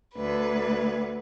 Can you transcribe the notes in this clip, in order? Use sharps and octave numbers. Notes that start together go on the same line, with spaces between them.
D2 B4